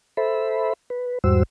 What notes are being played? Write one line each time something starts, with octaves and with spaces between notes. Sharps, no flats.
A4 C5 E5 B5
B4
E2 G#2 G3 F#4 C5 E6